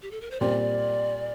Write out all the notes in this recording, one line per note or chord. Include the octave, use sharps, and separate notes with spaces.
G4
A4
A#4
C5
A#2 G3 C4 D5